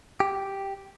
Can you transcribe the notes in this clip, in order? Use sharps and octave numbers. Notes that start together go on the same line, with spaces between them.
G4